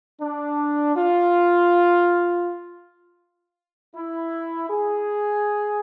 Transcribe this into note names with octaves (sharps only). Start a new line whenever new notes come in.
D4
F4
E4
G#4